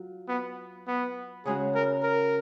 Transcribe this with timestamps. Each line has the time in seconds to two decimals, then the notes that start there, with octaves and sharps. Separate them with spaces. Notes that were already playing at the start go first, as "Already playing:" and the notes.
Already playing: F#3 F4
0.28 B3
0.88 B3
1.45 C#3 G#3 C#4 F#4 G#4
1.75 A#4
2.03 A#4